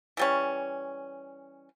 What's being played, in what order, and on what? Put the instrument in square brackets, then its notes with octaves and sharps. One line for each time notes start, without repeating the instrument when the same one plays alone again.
[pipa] E3 G3 C#4